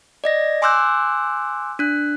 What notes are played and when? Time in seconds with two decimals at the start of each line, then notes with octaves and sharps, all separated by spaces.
0.24 D5 D#5 A#6
0.62 G#5 C6 D6 E6 F#6 G6
1.79 D4 F#6